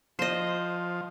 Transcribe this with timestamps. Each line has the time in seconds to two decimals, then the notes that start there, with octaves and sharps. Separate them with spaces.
0.19 F3 C5 D#5